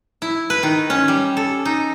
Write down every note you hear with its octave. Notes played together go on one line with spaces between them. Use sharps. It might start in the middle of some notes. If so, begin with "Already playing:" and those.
E4
B4
D#3
C#4
G3
A4
D#4